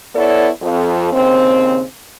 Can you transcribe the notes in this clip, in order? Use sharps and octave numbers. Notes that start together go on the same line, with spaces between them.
B3 E4 A4 C#5 D5
F2
D#2 C#3 C4